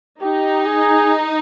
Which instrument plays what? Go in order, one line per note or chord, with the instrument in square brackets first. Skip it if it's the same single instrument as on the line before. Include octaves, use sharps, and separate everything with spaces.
[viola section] D#4 [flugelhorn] G4
[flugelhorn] G#4